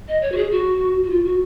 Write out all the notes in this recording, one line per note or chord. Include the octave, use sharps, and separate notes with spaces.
D#5
C#5
F#4
G#4
F#4
F#4
F4
F#4